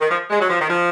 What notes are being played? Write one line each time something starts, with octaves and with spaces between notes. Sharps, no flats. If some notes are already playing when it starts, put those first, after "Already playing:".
D#3
F3
G#3
F#3
F3
D#3
F3